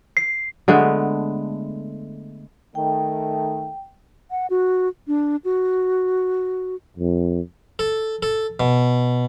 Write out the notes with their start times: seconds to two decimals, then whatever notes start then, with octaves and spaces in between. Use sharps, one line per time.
0.17 C7
0.68 D3 G#3 A3 B3
2.75 D#3 A3 G5
4.31 F#5
4.50 F#4
5.07 D4
5.45 F#4
6.97 F2
7.79 A4
8.23 A4
8.60 B2